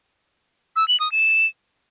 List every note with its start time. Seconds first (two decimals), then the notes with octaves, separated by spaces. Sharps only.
0.76 E6
0.88 F#7
1.00 D#6
1.12 E7